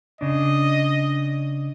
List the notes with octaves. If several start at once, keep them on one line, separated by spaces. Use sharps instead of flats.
C#3 D4 D#5